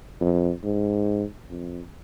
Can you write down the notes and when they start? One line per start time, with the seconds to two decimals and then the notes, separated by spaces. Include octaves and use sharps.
0.21 F2
0.64 G#2
1.50 F2